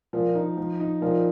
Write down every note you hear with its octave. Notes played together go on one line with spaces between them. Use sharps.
A#2 F3
D#4
F3
D#4
A#2 F3